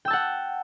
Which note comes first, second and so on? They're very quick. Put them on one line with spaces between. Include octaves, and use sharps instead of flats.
G5 E6 A5 F#5